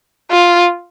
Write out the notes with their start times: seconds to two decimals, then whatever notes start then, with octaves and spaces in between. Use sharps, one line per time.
0.31 F4